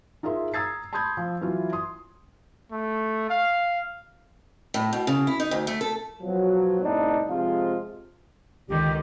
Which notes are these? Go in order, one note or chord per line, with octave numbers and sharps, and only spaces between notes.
D#4 F4 G#4 A#4 E5 C6
A#5 D#6 E6 G#6 A6 C7
A5 B5 C6 D#6 G6 G#6
F3
E3 F#3 E4 F4
C6 D#6
A3
F5
A2
B2
C#3
E4
D#4
D2
A3
A4
B2 F3 F#3
C2 A2 B3 D4 D#4
C3 F3 G#3 F4
C#2 D3 D#3 G4